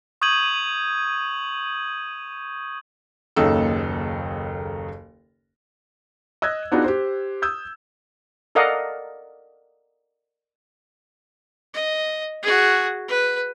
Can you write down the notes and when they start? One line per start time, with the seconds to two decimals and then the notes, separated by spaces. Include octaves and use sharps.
0.22 C#6 D#6 G6 G#6 D#7 F#7
3.36 F#1 D#2 C#3 D#4 A4 E6
6.42 D#5 E6 F#6 G#6
6.72 B3 D4 D#4 F4 F#4 G#4
6.84 G4 C5
7.42 D#6 E6 G6 G#6
8.55 A4 A#4 D5 D#5 F5 F#5
11.74 D#5
12.42 F#4 G#4
13.08 B4